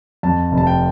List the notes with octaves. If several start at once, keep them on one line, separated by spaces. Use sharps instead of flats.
F2 A5
F1
A5
G5